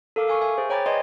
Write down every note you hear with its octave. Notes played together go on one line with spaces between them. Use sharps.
A4 A#4 F5 D6
F5 G#5 C#6 F6
A#4 E5 G#5
G#4 C5
C#5 G5 A#5 B5 D6 A6
B4 D5 D#5 G#5 C6 G#6